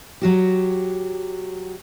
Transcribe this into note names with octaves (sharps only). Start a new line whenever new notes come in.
F#3 F#4 G4